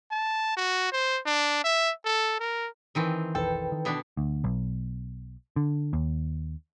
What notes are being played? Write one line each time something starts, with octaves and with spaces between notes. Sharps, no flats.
A5
F#4
C5
D4
E5
A4
A#4
D#3 E3 C4
F1 B1 A4 B4 G5
D#3
B2 B3 D4
D2
B1
D3
D#2